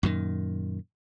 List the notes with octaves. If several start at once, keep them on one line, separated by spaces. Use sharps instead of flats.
F#2 A#2 D#3